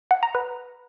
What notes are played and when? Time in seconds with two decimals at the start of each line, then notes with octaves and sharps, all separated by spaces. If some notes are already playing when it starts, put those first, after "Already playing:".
0.11 F#5
0.23 A#5
0.35 B4